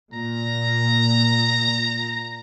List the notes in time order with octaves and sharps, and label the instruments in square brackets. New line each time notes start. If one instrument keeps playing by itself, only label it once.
[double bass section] A#2 [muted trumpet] A#5